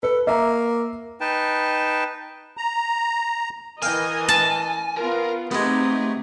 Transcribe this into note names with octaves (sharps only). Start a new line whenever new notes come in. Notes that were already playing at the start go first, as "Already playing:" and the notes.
A4 B4
A#3 E5 A#5
D#4 B4 G5 A5
A#5
E3 A#4 D#5 F5 G5 G#5
A5
B3 F4 A#4
G#3 A3 B3 C4 D#4 G4